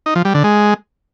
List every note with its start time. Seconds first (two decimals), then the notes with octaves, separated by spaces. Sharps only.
0.06 D#4
0.15 F3
0.25 G3
0.34 D3
0.44 G#3